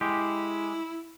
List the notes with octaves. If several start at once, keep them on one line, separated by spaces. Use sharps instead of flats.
G#3 E4 G4